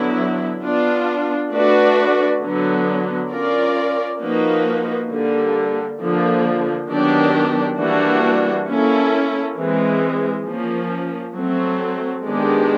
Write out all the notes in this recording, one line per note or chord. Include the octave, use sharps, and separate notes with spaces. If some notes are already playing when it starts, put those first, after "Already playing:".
Already playing: D3 F#3 B3 E4
B3 D4 F4
A3 D4 F#4 B4 D5
D3 F#3 B3
C#4 F4 A#4 D5
F3 A#3 D#4 F#4 B4
D3 G3 A#3
D3 F3 A#3
D#3 F#3 B3 D4 G4
E3 G3 A#3 D4 F#4
A#3 C#4 E4 A4
E3 G#3 C4
F3 A#3 C#4
F#3 A3 C4
D#3 G#3 B3 D4 G4